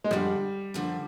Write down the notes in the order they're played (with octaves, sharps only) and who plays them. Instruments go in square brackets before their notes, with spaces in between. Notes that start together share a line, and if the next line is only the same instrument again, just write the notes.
[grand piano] G#3
[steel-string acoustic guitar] F#2 D3 F3 [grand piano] G3
[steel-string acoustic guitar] F#2 D3 F3